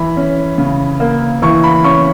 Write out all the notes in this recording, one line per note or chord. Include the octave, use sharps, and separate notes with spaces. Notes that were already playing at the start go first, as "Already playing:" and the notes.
Already playing: E3 B5
C#4
C#3
A#3
E3 C#6
B5
C#4 C#6